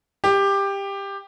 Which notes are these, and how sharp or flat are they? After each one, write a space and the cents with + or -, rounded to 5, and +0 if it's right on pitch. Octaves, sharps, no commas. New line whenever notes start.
G4 +15